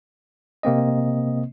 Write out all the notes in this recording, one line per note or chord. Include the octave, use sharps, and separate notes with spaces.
C3 A#3 C4 D#5